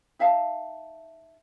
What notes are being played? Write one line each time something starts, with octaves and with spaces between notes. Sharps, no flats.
D#4 E5 F5 A5